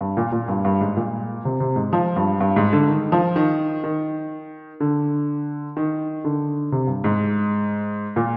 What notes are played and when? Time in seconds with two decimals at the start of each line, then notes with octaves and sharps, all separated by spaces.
0.01 G2
0.17 A#2
0.32 A#2
0.48 G2
0.65 G2
0.81 G#2
0.97 A#2
1.45 C3
1.60 C3
1.76 G#2
1.93 F3
2.16 G2
2.40 G2
2.56 G#2
2.73 D3
2.88 D#3
3.12 F3
3.36 D#3
3.84 D#3
4.80 D3
5.77 D#3
6.25 D3
6.72 C3
6.87 G2
7.04 G#2
8.16 A#2